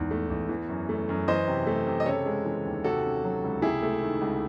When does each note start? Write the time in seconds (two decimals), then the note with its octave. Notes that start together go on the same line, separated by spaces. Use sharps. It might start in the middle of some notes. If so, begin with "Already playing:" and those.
Already playing: E2 G#2 D#3
0.11 A3
0.30 E2
0.49 E3
0.69 F#2
0.89 A3
1.09 F#2
1.28 E3 C5 D#5
1.47 C3
1.67 A3
1.87 C3
2.00 D#5
2.06 C#3 A4 C#5
2.26 G#3
2.45 E3
2.65 D#2
2.84 C3 F#4 A4
3.03 C#4
3.24 F#3
3.43 C#2
3.62 C3 E4 G#4
3.83 A3
4.02 D#3
4.21 C#2